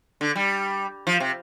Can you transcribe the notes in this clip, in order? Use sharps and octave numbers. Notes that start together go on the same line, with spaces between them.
D3
G3
F3
C3